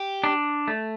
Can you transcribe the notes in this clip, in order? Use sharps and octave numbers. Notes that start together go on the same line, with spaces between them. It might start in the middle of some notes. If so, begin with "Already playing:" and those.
Already playing: G4
D4
A3